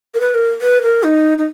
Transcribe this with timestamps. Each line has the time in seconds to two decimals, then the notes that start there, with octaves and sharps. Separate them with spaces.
0.14 A#4
0.20 B4
0.34 A#4
0.61 B4
0.82 A#4
1.03 D#4
1.38 D#4